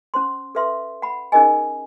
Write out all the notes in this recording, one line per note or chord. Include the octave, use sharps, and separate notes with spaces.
C#4 C5 C6
A4 B4 E5 C6
F#5 B5
C#4 D#4 G#4 A#4 D#5 G#5